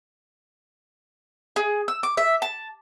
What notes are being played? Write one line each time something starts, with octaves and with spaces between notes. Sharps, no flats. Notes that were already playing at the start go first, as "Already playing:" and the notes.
G#4
E6
D6
E5
A5